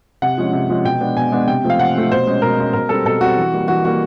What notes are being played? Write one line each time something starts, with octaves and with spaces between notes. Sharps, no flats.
C3 F#5
F3 G#3 C#4
C3
F3 G#3 C#4
B2 G5
G#3 B3 D4
B2 G#5
G#3 B3 D4
C3 G5
F3 A3 C4
F5
C3 F#5
F3 A3 C4
B2 C5
G#3 C#4
B2 A#4
G#3 C#4
B2 A#4
G3 C4 A4
B2 A4
G3 C4 F#4
E3
G3 A#3
E3 F#4
G3 A#3 F#4